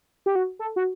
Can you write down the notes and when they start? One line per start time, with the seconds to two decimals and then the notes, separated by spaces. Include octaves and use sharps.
0.26 G4
0.35 F#4
0.59 A4
0.76 F#4